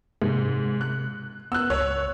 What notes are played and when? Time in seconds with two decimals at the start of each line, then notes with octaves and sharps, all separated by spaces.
0.22 G#2 C3
0.81 F#6
1.52 B3 E6 F#6
1.70 C#2 C#5